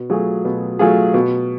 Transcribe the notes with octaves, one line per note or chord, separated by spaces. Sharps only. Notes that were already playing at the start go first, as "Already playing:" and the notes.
Already playing: B2
F#3 A3 F4 G#4
B2
F#3 A3 F4 G#4
B2